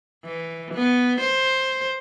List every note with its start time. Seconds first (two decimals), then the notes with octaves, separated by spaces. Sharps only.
0.24 E3
0.74 B3
1.20 C5